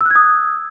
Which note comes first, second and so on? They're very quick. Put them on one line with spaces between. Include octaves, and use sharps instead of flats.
E6 F#6 G#6 D#6